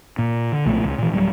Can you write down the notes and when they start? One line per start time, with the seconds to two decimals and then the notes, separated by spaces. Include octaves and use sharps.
0.18 A#2
0.52 D3
0.66 B1 A#2 F3 A3
0.85 C#2
0.98 A#2 E3
1.11 D1 F#3 G3